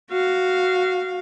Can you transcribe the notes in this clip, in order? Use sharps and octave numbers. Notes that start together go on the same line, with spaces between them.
F#4 F5